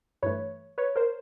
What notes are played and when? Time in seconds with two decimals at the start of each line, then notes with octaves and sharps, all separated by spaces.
0.23 G2 E3 A3 B4 C#5
0.78 B4 C#5
0.96 A#4 C5